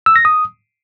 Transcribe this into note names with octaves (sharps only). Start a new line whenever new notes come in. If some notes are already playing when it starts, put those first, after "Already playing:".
E6
A#6
D#6